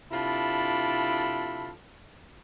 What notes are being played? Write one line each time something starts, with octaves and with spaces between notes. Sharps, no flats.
C3 D4 E4 F4 A4 B5